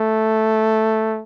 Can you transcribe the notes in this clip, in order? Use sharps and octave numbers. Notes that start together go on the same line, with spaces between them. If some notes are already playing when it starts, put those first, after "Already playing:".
Already playing: A3